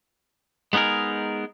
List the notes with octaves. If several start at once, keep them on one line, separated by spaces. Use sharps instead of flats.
G#3 B3 D#4 G#4 A#4